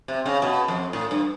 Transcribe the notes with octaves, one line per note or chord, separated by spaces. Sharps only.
C3
C#3
B2
F2
A2
G2